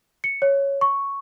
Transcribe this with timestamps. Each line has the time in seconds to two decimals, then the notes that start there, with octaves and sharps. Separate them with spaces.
0.24 C#7
0.42 C#5
0.81 C#6